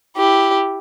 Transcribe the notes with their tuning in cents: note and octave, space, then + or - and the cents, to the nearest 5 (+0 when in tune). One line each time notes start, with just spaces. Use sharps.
E4 +0 G4 +0